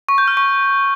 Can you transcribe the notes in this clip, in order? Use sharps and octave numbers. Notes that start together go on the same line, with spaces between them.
C#6
G6
F6
C#6